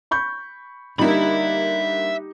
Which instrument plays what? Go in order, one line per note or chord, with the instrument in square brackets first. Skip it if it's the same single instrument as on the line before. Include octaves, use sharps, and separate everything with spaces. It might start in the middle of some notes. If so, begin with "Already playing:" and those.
[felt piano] B5 C#6 G6
[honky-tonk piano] D3 G3 A#3 [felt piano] D#4 G4 [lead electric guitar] E5 B5